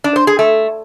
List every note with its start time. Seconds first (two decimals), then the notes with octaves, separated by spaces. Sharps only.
0.04 D4
0.16 C5
0.27 G#4
0.39 A3